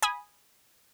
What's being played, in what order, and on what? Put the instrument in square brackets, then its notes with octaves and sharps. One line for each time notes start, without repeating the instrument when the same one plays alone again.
[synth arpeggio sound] G#5 B5 D#6